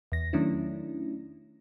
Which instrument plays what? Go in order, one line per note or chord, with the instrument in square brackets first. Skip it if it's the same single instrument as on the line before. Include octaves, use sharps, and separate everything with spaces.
[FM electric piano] E2 A#6
D#3 F#3 A3 C#4 D4 E4